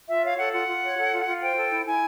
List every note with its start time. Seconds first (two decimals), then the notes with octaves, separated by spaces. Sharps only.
0.09 F4 E5
0.23 C#5 F5
0.38 A4 F#5
0.53 F4 F#5
0.68 F4
0.83 C#5
0.97 A4
1.12 F4
1.27 F4
1.42 C5 G5
1.56 A4
1.71 E4
1.86 E4 G#5